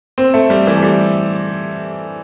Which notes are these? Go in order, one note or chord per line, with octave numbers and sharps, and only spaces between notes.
C4
A3
G3
E3
A3
G3